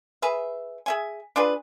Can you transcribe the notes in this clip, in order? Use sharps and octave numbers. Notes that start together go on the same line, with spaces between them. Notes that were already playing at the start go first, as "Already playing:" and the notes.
G#4 B4 E5
G#4 E5 G#5
D4 F4 G#4 B4